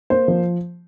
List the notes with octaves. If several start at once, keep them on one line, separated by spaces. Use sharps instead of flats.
A#3 C5
F3